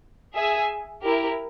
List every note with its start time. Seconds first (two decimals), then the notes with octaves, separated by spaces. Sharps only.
0.34 G#4 E5 G#5
1.02 E4 G4 A#4